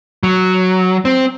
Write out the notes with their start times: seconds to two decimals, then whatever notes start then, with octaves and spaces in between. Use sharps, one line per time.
0.23 F#3
1.05 C4